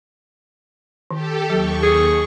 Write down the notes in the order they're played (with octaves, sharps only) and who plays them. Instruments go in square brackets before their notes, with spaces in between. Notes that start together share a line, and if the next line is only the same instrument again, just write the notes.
[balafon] D#3 [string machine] G4 A4
[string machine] D#2 C#6 [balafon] F#3
[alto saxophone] G#4